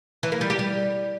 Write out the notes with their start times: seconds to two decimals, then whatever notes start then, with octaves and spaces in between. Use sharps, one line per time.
0.23 E3
0.32 A#3
0.41 G3
0.50 G4
0.59 G3